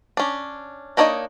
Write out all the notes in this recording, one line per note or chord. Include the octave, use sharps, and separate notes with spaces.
C#4 D4
A#3 D4 D#4 C#5 D#5